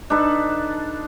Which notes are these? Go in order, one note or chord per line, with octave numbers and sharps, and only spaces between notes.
D4 D#4 A4 B4